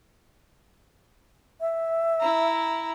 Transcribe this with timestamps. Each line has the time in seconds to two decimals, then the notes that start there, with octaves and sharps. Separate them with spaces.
1.61 E5
2.20 E4 A#5